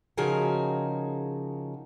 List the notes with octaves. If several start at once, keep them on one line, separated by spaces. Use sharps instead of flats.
C#3 F3 D#4 F#4 G#4 A#4